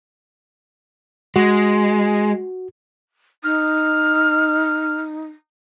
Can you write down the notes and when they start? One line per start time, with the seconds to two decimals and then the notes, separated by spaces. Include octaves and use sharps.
1.36 G#3 F#4
3.44 D#4 F6